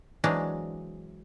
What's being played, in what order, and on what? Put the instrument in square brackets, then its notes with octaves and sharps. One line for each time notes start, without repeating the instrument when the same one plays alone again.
[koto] E3 F#3 G#3 C4 D4